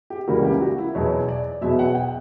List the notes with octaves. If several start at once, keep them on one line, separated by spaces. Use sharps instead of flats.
G4
C#2 C#3 E3 G3 A#3 F#4
G4
F#4
E4
E2 B2 F#3 C#5
D5
E2 B2 F#3 E5
F#5
G5